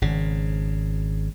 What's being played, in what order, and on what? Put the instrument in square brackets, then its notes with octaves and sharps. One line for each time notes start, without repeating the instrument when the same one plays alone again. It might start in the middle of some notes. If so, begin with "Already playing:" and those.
[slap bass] G#1 C#3